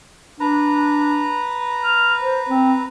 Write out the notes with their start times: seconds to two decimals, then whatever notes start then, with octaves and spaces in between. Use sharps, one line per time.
0.40 D4 B4 A#5
1.83 F6
2.20 C5
2.49 C4